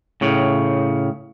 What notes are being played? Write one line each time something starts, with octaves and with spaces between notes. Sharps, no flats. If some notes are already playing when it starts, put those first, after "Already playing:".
A2 C#3